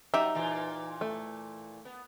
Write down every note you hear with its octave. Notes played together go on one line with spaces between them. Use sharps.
F#3 D#4 G4 E5
A#2 E3 F4
A3
B3